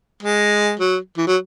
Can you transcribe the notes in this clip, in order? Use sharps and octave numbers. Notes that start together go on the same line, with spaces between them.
G#3
F#3
E3
F#3